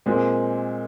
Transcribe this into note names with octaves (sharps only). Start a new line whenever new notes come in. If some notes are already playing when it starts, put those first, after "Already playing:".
A#2 G#3 C4